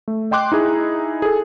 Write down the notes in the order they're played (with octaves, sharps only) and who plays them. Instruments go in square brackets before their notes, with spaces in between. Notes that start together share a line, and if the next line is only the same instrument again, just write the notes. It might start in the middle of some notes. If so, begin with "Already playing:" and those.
[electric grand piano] A3
D#5 G5 C6 D6 F#6
D#4 E4 G#4
G#4 A4